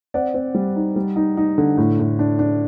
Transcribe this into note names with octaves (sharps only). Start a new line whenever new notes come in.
C4 D5 F#5
C4
G3
D#4
G3
D#4
D#4
D3
A2
A2
D4
D4